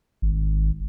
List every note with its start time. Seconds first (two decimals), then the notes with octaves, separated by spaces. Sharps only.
0.22 G#1